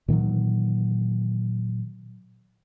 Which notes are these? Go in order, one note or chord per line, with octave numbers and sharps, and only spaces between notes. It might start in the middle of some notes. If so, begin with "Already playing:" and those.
A#2 D#3 E3 F#3